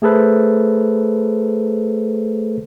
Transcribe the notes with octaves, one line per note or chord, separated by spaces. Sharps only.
A3 G#4 A4 B4 C5